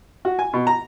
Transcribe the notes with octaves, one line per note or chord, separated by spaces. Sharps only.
F#4
G#5
B2
A#5